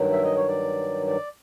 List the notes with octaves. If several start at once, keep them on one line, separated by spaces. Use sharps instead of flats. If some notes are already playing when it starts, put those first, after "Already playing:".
Already playing: G2 D#3 F#3
E5
D#5
C#5
D5
D5